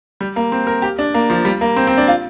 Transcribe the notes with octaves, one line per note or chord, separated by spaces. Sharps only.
G3
A#3
C4
A#4
G4
D4
A#3
F3
G3
A#3
C4
C4
D4
F4